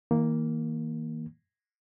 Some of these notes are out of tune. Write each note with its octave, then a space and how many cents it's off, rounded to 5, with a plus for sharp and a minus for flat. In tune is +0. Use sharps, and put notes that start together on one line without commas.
D#3 +45 A#3 +0